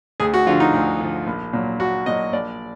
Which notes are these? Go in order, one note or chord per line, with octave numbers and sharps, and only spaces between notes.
D2 G#4
F#4
D3 F3 F4
D#4
D2
D3 F3
A#1
A#2 F#3
A#1 F#4
A#2 F#3 D#5
A#1 D5